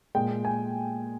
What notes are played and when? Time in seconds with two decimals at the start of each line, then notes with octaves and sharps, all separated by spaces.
0.15 A#2 G#3 G5
0.45 G#5